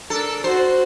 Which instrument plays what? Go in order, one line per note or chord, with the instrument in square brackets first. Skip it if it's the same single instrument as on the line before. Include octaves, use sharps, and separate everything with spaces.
[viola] D4 A#4 [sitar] A4
[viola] F#4 [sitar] C5